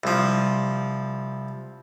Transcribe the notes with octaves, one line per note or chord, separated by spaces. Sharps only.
C2 F3